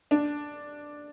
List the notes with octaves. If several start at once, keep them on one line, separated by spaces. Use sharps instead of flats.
D4